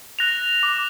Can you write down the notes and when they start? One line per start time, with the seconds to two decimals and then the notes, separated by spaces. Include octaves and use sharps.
0.19 F#6 A#6 F7
0.63 D6